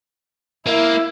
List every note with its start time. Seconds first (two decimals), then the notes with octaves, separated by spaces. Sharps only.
0.67 A#3 E4